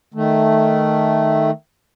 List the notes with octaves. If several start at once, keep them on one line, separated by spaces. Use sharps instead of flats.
D#3 A3